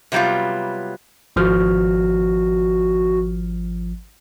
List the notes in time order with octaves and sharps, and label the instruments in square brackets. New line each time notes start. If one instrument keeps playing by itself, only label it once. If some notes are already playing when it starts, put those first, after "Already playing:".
[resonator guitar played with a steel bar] C3 F#3 G3 B3 F4
[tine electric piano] G#1 F3 F6 [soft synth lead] F#4